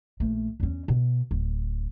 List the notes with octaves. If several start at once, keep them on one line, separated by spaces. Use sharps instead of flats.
A#1 A3
E2 C#4
B2
D1